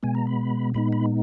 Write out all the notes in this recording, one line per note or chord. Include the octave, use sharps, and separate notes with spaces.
B2 G#3 B3 G#5
A#5
B5
A#2 G#3 B3 D#4 B5
B5